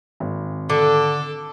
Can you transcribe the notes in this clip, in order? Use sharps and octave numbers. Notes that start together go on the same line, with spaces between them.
G#1
D3 A4 D6